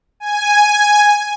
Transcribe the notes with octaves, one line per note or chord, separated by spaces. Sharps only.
G#5